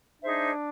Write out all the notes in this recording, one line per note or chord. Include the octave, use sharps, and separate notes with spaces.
D4 D#4 G#4 C5 E5